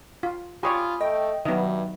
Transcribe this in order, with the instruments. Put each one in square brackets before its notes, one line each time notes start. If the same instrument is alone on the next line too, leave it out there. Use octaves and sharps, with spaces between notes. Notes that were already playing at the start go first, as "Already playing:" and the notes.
[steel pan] F4
[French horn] F4 [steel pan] G4 C#5 D5 [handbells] G#5 B5 D#6
[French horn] A3 [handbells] D#5 [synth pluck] G5
[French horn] G2 [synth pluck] D#3 F#3 [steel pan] B3 D#5 [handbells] E5